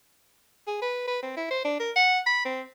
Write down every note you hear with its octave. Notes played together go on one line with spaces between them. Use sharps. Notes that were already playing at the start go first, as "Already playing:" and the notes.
G#4
B4
B4
C4
E4
C5
D4
A#4
F#5
B5
C4